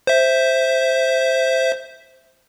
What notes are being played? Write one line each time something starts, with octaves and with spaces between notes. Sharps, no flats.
C5 E5